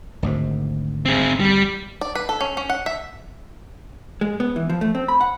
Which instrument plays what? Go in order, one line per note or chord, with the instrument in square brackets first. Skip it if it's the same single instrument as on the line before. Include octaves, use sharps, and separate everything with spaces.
[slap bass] G#1 D2 G#2
[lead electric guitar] C4 G#4
G3
[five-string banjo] D5
B4
A4
C#4
C#4
F#5
E5
[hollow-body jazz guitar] G#3
B3
E3
F3
A3
C4
B5
F#5